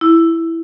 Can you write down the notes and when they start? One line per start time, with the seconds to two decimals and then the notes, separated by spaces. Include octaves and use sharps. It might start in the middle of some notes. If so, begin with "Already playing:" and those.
0.01 E4